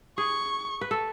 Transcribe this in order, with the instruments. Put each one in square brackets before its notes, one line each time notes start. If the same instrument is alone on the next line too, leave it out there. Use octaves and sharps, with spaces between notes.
[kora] G#4 [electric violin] C#6
[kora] B4
A4